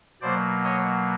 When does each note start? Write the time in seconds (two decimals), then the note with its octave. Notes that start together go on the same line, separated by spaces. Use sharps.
0.21 B2 F#3 A#3 C5 D5
0.64 C#5 D#5